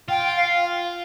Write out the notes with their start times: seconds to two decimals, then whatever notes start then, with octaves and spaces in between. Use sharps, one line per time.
0.08 F4 G5
0.36 F5